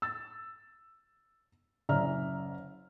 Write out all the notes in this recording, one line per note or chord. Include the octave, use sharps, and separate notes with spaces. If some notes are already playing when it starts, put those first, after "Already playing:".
E6 A6
F#1 C#4 D5 E5 A#5 F6